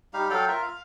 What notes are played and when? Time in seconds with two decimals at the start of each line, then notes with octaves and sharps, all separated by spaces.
0.14 G3 D#4 G4 F5
0.30 F#3 A4 F5 G5
0.48 F4 A#4 E5
0.62 F5